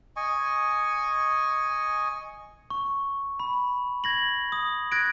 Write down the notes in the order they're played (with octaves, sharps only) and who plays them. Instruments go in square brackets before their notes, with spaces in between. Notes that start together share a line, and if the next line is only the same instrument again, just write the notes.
[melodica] D#5 G#5 C#6
[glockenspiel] C#6
B5
G#6 A#6 F#7
D#6
F#6 G#6 A#6 D7